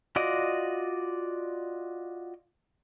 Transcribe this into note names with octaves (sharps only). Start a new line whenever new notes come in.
F4 F#4 D5 D#5